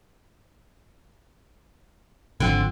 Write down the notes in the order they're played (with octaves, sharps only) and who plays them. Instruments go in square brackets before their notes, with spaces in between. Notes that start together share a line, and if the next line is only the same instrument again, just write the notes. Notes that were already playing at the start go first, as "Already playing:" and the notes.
[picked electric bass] G#1 D#3 F3 [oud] D3 C4